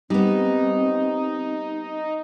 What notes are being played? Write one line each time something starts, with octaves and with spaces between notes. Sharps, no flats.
G3 B3 C4 D#4